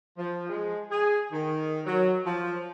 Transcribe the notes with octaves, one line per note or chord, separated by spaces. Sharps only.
F3
G#3
G#4
D#3
F#3
F3